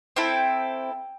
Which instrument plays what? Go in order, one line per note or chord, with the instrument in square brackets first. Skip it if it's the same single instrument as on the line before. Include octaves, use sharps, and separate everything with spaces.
[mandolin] C4 E4 A4 G5